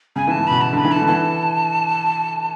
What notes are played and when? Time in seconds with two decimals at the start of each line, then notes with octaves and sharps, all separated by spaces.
0.16 C#3 G#5
0.27 E3 A5
0.39 C#3
0.47 B2 B5
0.61 A5
0.73 D3 B5
0.85 E3
0.92 A5
1.02 D3
1.07 E3 A5